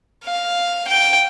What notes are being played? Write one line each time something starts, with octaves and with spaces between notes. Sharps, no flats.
F5
G5